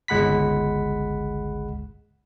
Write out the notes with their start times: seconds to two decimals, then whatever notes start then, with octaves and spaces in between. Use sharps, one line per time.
0.08 G1 C#2 G#3 F#5 B5 B6